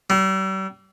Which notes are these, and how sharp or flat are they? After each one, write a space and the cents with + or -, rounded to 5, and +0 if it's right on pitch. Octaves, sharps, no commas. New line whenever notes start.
G3 -40